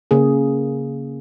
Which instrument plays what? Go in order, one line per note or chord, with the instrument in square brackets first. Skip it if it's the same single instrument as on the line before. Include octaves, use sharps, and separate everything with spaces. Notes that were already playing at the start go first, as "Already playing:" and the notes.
[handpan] C#3 A#3 G#4